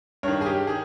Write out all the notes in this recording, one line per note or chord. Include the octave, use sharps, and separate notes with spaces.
G2 D#3 C#5
G#4
G4
D#3 G#4